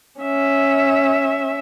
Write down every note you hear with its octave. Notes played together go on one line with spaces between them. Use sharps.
C#4 E5